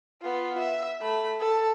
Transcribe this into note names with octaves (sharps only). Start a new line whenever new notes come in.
B3 F4
E5
A3 B5
A4 A5